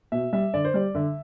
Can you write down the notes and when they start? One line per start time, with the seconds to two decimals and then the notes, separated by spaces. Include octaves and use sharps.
0.12 B2 E5
0.33 G3 E5
0.54 D3 D5
0.65 C5
0.74 G3 D5
0.95 D3 E5